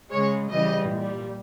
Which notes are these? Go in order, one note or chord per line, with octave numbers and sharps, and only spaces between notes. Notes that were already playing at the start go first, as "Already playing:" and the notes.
C#3 G#3 C#5
C#3 E3 G3 D#5
A#2
G3